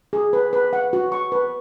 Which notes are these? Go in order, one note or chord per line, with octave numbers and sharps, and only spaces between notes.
G#4
B4
B4
F#5
F#4
C#6
B4